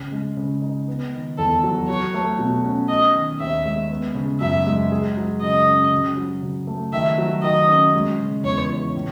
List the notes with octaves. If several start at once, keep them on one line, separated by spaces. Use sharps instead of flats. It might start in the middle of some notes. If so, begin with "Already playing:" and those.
Already playing: C#3
G#3
C#3
D#4
B3
D#3
E2 A4
F#3
F#4 C#5
A3
B2
C#4
D#4 D#5
D#3
D#2 E5
G#3
B3
C#3
F#2 E5
G#3
G#4
F#3
C#3 D#5
C#4
C#3
F#3
C#3
A3
D#3 E5
F#3
D#3 D#5
C#4
G#3
C#3
E2 C#5
E3
A2